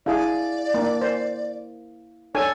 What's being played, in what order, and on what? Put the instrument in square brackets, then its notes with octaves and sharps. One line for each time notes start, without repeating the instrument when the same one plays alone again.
[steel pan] D4 G#4 [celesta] E4 E5 F5 [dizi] D5
[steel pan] A#3 D4
C5
[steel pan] D4 A4 G#5 [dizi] C#5